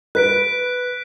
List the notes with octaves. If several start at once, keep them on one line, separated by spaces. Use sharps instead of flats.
B4 F#6 B6 D7